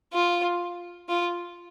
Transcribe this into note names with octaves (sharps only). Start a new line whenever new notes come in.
F4
F4